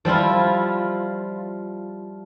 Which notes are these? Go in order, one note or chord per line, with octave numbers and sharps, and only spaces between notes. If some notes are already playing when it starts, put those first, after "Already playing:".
F3 G3 E4 F4